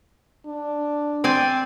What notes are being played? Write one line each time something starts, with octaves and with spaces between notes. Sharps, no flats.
D4
C4 D5 G#5